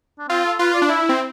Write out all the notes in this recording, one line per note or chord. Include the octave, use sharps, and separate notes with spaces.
D4
C4 F4
A4
F4 B4
D5
D4
E4 E5
C4